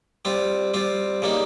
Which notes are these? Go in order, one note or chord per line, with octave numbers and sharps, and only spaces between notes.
G3 C4 F4
G3 C4 F4
C#3 G3 A#3 D#4